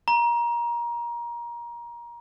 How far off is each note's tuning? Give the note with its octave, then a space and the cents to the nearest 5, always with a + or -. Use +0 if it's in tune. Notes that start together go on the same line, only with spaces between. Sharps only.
A#5 +25